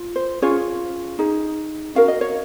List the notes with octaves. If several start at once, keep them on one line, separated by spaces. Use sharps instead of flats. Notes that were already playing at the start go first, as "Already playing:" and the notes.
Already playing: F4
C5
C#4 F4 G#4 C#5
D#4 G#4
C#4 F#4 A#4 F5
D#5
C#5